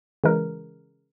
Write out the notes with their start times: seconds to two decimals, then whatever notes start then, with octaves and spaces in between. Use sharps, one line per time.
0.24 C#3 E3 G#3 A#4